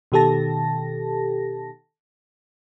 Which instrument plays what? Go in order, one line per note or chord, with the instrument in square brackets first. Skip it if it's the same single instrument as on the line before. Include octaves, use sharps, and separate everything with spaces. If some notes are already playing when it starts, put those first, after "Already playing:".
[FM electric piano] B2 D#3 G4 A4 A5 A#6